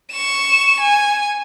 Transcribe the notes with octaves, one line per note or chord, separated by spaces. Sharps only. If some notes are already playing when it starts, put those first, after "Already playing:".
C#6 E7
G#5